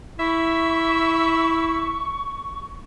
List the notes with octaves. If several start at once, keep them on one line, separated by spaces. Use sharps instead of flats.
E4 E5 C#6